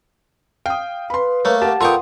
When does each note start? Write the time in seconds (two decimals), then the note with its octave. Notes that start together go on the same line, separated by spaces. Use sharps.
0.66 F5 G5 D#6
1.10 B4 B5 C6
1.45 A3 A#3 C#5
1.62 G4 A#4 F#5 A5
1.81 A#2 A4 B4 G5 A#5 C6 C#6 D#6